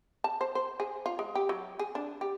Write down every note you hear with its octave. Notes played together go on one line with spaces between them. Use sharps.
A5
C5
C5
G#4
F4
G#3
G4
F#3
G#4
D4
G4